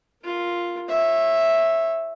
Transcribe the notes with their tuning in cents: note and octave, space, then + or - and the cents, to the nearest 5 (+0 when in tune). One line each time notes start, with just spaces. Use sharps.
F4 +0 A#4 +0
C#5 -30 E5 +0